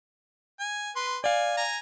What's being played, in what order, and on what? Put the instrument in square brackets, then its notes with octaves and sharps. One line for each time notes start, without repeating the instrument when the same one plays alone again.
[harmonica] G#5
B4 C6
[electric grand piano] D5 F5 [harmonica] G#5
[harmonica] G#5 A#5